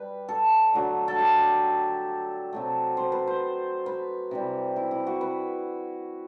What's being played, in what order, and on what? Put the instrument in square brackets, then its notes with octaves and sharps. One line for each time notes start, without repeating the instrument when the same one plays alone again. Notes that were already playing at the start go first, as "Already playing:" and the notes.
Already playing: [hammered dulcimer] G3 B4
A4
D3 F#3 A3
A4
G4
C3 F#3 A3
C5
B4
C5
B4
C3 E3 G3
E4
E4
F#4
B4